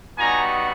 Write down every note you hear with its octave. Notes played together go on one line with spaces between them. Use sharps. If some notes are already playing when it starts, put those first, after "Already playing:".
G3 B3 D#4 F#4 G#5 A#5